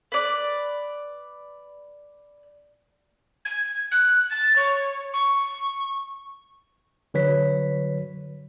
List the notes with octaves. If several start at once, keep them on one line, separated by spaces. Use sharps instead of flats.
B4 D5
G#6
F#6
A6
C#5
C#6
D3 F#3 B4 C#5 B6